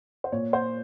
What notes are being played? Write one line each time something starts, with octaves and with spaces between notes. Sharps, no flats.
C5
A#2 C#5
C5